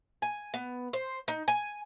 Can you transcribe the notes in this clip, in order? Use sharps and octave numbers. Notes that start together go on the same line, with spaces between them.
G#5
B3
C5
D#4
G#5